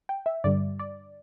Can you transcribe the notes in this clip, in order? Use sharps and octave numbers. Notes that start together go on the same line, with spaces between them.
G5
E5
G2 D3 G3 D5
D5